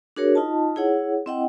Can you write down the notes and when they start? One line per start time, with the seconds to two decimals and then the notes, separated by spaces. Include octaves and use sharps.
0.16 D4 F#4 G#4 A#4 C#5
0.35 D#4 F4 D#5 A5
0.76 E4 G#4 C#5 F#5
1.26 C4 E4 D#5 F#5 G5